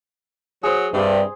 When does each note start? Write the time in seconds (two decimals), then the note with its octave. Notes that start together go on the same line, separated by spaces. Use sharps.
0.63 F#3 G#4 C5
0.94 G2 C3 G3